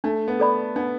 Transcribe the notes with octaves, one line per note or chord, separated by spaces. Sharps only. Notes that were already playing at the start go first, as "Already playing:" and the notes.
A3 D4
B3
A4 D5 B5
B3 D4